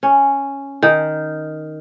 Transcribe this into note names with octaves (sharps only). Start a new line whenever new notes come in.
C#4
D#3